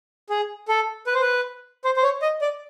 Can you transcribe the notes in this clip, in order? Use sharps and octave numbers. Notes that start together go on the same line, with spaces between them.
G#4
A4
B4
C5
B4
C5
C5
C#5
D#5
D5